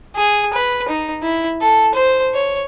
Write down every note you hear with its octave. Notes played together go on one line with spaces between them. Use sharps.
G#4
B4
D#4
E4
A4
C5
C#5